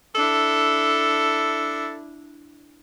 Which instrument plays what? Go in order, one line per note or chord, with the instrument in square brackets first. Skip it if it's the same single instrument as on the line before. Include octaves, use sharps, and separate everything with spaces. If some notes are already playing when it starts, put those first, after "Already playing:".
[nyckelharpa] D4 E4 [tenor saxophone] A4